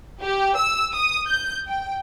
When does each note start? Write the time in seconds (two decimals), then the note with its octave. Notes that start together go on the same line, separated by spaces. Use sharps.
0.21 G4
0.57 E6
0.92 D#6
1.26 G6
1.66 G5